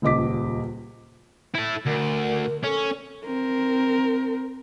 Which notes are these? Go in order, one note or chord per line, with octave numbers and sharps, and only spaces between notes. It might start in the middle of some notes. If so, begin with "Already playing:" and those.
D#1 C#2 D#5 D6 B6
E4 A4
D2 A#4
C#4 A4
C4 A#4